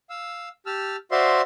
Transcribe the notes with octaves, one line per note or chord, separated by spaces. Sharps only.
F5 E6
G4 A5 E6 F6
F#4 C5 D5 E5 F5 C6